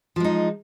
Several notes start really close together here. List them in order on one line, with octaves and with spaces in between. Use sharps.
F3 G#3 D#4